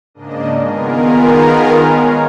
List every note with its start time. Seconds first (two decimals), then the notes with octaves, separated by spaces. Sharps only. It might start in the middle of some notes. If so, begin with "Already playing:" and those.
0.14 G#2 C#3 A#3 D4 D#5
0.60 D#3 B3 F4 G#4 A#4
1.80 G#3 C#5 F5